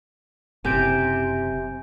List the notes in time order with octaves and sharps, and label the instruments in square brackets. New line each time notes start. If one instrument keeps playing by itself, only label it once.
[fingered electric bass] F#1 [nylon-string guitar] C3 [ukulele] G4 [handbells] G#5 G6 D7